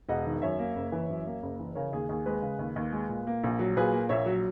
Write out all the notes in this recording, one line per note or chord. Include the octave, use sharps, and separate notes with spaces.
E1 D#5 F#5
D#3
F#2 C#5 E5
A#3
F#1
E3
F#2
A#3
F#1
E3
C#3 A#4 C#5
D#2 G#4
D#2 G#4
G#3 G#4 B4
C#3
D#2
D#2
G#3
A#2
A#3
A#1
F#3
A#2 G#4 B4
A#3
A#1 C#5 E5
F#3